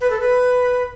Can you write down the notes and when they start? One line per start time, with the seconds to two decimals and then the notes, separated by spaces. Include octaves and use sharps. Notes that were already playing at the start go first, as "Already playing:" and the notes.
0.01 B4
0.10 A4
0.20 B4